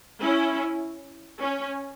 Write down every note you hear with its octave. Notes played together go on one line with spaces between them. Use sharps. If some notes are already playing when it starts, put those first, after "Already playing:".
C#4 E4
C#4